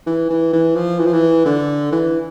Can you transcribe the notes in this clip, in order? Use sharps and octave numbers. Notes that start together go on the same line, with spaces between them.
E3
E3
E3
F3
E3
F3
E3
D3
E3